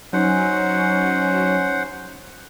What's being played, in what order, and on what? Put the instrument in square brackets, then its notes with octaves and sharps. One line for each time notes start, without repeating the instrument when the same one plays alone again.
[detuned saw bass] F#3 [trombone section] C#4 [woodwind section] D#4 [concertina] C5 F#5